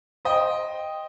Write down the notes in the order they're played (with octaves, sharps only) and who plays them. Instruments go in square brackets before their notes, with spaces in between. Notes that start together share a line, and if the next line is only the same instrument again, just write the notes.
[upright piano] C5 D#5 G5